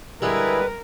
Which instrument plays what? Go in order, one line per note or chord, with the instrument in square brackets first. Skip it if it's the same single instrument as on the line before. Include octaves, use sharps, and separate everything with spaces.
[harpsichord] D3 G3 G#3 [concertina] E4 G#4 [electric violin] A#4 [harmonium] B4